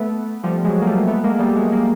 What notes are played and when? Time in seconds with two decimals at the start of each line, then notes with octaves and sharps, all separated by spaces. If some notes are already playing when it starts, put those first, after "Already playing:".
Already playing: A3 B3
0.43 F3 G3
0.64 F#3 G#3
0.81 A#3
0.86 G3 A3
1.07 A3 B3
1.24 G#3 A#3
1.39 G3 A3
1.56 F#3 G#3
1.71 G#3 A#3